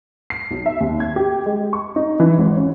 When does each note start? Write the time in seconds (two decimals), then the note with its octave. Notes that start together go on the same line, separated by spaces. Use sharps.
0.30 C7
0.51 B1
0.66 E5
0.80 D#2
1.00 G#6
1.16 G4
1.46 G#3
1.73 C#6
1.96 D#4
2.20 E3
2.38 G#1
2.57 C#4